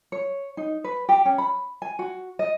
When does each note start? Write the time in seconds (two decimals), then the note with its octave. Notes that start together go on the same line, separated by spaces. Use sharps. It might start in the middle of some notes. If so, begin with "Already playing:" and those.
0.12 C#5
0.57 D#4
0.84 B4
1.09 G4
1.25 C#4
1.38 B5
1.82 G#5
1.99 F#4
2.39 D#5